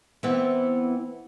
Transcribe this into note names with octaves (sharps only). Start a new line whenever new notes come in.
E3 B3 C4